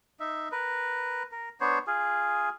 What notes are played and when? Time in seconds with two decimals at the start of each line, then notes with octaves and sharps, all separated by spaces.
0.20 D#4 E5
0.52 A#4 B4
1.32 A#4
1.61 B3 D4 C5 C#5
1.87 F4 G#4